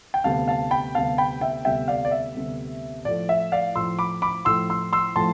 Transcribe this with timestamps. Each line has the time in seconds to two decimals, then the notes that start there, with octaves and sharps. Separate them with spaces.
0.14 G5
0.24 D2 C3 G3 B3 F5 A5
0.48 F5 A5
0.71 G5 B5
0.95 D2 C3 G3 B3 F5 A5
1.18 G5 B5
1.41 E5 G5
1.65 D2 C3 G3 B3 E5 G5
1.88 D5 F5
2.05 D5
2.11 E5
2.35 D2 C3 G3 B3
3.05 A2 F3 A3 D5
3.29 E5
3.52 D5 F5
3.75 A2 F3 A3 C6 E6
3.99 B5 D6
4.22 B5 D6
4.45 A2 F3 A3 C6 E6
4.70 C6 E6
4.93 C6 E6
5.16 A2 F3 A3 A5 C6